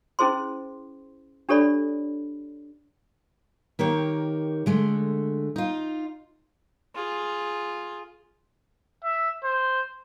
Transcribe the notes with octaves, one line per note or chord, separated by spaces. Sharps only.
C#4 E4 G#4 C5 C6
D4 G4 A4 C#5 D5 B5
D#3 A#3 G4 C#5
D3 G#3 A3
D#4 F4
F4 G#4
E5
C5